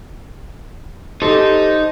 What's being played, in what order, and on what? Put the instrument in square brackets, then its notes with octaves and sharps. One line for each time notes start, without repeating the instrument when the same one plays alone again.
[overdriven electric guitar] D#4 [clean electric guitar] G4 A4 C5